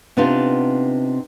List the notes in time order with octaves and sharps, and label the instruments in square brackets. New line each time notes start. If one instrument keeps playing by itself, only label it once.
[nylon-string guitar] C3 B3 C4 D4 D#4 F4